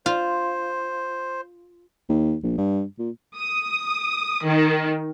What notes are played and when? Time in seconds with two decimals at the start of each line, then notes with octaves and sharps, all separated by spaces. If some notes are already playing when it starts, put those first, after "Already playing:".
0.06 F4 C5
2.09 D#2
2.43 A#1
2.58 G2
2.99 A#2
3.38 D#6
4.45 D#3